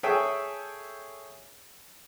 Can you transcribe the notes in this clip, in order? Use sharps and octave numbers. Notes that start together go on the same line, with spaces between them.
G#4 A4 C#5 E5 G5 G#5